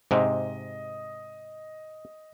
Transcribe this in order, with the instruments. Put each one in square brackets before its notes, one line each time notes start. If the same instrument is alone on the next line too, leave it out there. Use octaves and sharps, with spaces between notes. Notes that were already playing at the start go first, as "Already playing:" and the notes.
[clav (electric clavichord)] G#2 C3 [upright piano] D#5